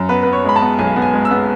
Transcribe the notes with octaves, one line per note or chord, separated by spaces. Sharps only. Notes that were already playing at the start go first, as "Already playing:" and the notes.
Already playing: F#2
B3 B4
B3 B4
C#5
G#3 B5
A5
B3
B1 G#5
B3
G#5
G#3
E6
B3